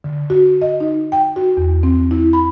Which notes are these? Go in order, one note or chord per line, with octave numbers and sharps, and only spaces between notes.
D3
F#4
D#5
D#4
G5
F#4
E2
C4
E4
B5